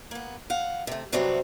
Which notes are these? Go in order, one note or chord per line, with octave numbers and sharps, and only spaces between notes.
A#3 B3
F5 F#5
C3 A3
C3 F#3 G3 A3 B3 C4